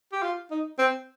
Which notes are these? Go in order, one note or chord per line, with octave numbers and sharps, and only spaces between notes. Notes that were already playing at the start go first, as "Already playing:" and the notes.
G4
F4
D#4
C4